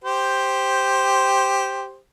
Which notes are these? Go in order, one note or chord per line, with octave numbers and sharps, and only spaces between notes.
G4 C5